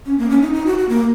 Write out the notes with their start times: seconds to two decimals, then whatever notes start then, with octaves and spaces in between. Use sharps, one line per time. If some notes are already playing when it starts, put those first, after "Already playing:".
0.06 C#4
0.18 A#3
0.30 C#4
0.42 D#4
0.54 D#4
0.66 F#4
0.78 F#4
0.89 A#3